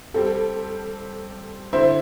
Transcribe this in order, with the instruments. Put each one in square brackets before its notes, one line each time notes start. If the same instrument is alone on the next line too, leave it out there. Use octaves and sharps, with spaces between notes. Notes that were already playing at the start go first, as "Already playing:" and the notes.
[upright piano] G3 C4 G4 [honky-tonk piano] A4
[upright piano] D3 C4 E4 [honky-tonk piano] C5